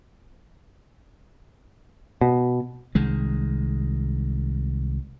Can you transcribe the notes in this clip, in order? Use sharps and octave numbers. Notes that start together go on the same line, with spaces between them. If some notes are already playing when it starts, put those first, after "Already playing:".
B2
C2 D#3 G#3